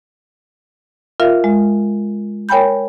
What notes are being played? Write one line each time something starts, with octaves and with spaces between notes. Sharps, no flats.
F4 A#4 E5 F5
G#3
A#4 C#5 G5 G#5 B5 G6